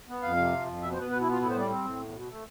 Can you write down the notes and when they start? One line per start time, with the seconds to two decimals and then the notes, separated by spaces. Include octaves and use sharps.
0.08 B3
0.22 F2 F5
0.37 C3
0.53 F3
0.66 F2
0.82 B2 E5
0.92 C5
0.97 B3 B4
1.10 B2 B4
1.21 E4
1.26 B3
1.31 F4
1.41 A2 E4
1.50 C5
1.54 G3
1.60 D5
1.70 C4
1.85 A2
2.00 E2
2.13 B2
2.29 A3